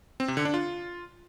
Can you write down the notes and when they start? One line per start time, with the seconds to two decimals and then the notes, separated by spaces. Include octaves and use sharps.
0.20 C4
0.28 C3
0.37 D3
0.45 D4
0.54 F4